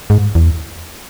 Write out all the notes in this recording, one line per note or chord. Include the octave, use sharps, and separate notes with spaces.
G#2
E2